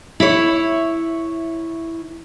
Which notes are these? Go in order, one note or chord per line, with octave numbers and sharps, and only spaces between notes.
E4 C#5